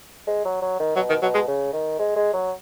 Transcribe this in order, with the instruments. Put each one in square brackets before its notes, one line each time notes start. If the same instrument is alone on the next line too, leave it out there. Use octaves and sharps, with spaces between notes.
[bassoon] G#3
F#3
F#3
D#3
[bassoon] B2 [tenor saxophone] F#3
[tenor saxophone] D#3
[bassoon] B2 [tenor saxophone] F#3
[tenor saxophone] G#3
[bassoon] C#3
D#3
G#3
G#3
F#3